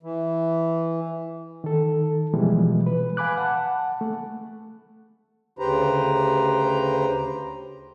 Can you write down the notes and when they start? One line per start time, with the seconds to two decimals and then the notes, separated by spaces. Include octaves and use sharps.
0.03 E3
1.64 D#3 A4
2.34 B2 E3 F3 G3 G#3
2.86 B4
3.17 F5 G#5 B5 D6 F#6
3.38 F#5 A5
4.01 A3
5.59 D2 C#3 G4 B4 C5 A#5